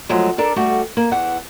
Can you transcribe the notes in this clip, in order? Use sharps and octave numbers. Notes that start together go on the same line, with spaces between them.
F3 F#3 G#3 A3
D4 A4 A#4 D5
G3 A3 F#4
A#3
E2 E3 F#5